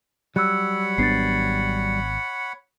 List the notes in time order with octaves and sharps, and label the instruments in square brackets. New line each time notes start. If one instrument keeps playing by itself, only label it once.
[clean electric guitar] F#3 G3 [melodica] C#5 F#5 B5 [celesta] E6 F#6
[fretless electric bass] G#1 B3 D4 [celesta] A6 C7